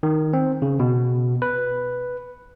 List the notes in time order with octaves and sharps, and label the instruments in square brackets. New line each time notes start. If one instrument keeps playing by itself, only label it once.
[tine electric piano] D#3
C4
C#3
B2
B4